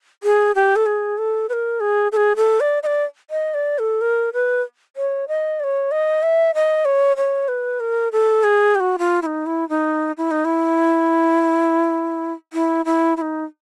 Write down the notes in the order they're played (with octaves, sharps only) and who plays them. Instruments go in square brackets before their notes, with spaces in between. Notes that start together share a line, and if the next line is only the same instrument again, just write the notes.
[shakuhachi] G#4
G4
A4
G#4
A4
B4
A#4
G#4
A4
G#4
A4
D5
D#5
D5
D#5
D5
A4
A#4
B4
C#5
D#5
D5
C#5
D#5
E5
D#5
C#5
C#5
B4
A#4
A4
G#4
G4
F#4
F4
E4
D#4
E4
D#4
E4
D#4
E4
E4
E4
E4
D#4